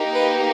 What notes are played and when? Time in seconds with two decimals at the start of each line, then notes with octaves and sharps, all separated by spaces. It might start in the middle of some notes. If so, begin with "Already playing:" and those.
Already playing: A#3 D#4 G4
0.13 B4